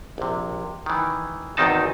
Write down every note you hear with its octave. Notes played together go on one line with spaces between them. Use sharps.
A#1 C3
D#3 E3
G#1 E2 D#3 C4 D#4 A5